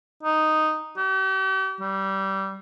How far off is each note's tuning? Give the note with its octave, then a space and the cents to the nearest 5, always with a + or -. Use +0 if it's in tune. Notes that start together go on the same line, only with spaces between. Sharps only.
D#4 -5
G4 -45
G3 -20